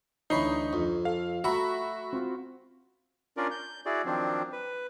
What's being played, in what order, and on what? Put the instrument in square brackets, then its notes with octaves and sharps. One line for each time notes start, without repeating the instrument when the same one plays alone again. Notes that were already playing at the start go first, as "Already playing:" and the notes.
[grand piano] D2 B5 C7 [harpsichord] E3 C#5 [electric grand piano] D#4
[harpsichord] F2
[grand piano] A4 [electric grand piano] F5
[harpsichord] A3 E5 [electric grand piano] F#4 B5 [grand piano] A#5
[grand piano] C4 F4
[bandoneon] C#4 D4 F4 A#4 D5
G6
E4 F#4 G#4 D5
D#3 F3 F#3 C4 D4
B4